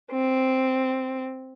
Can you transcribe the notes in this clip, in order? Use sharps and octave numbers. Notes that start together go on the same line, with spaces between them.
C4